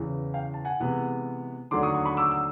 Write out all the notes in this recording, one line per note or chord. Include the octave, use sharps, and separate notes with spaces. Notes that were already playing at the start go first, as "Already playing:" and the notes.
Already playing: E2 C#3 E3
F5 G5
A5
F#5 G#5
C3 E3 G#3 B3
D#2 D3 F#3 A3 D4 C6 D6
C#6 D#6
C#6 D#6
B5 C#6
D6 E6
E6